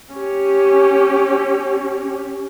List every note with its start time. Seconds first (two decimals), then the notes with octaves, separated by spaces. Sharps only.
0.14 C#4 G4